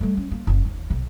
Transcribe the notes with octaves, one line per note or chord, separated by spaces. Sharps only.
G3 A3
C#4
A#3
F#1 C#3
D#2
B1 C3